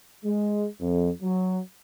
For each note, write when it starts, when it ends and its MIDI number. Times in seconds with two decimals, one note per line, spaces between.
0.24 0.66 56
0.80 1.09 41
1.21 1.59 54